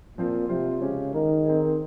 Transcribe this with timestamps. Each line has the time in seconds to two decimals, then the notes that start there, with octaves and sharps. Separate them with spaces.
0.17 A#2 F3 C4 F4
0.49 C3 F3 C4 F4 C5
0.81 C#3 G#3 C#4 G4
1.13 D#3 G#3 D#4 A#4
1.45 C4 D#4 G#4